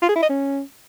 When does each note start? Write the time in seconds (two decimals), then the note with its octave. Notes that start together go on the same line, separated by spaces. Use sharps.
0.02 F4
0.09 G#4
0.16 E4
0.22 D#5
0.29 C#4